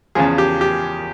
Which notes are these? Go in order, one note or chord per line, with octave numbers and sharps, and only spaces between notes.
E2 C#3 F3 G#4
G4
G4